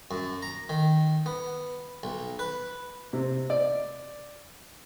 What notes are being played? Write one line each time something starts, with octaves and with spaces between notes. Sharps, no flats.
F#2
A#5
D#3
B3
B1
B4
C3
D5